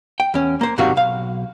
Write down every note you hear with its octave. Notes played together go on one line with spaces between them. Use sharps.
G5
E2 C#4
A#3 C5
G#2 C3 D#3 G3 F#4 F5
B1 F5